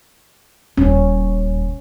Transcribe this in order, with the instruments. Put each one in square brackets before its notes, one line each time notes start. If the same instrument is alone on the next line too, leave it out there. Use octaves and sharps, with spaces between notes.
[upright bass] D#1 [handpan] C#4